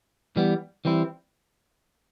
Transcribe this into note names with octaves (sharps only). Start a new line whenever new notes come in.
E3 G3 B3
E3 G3 C4 E4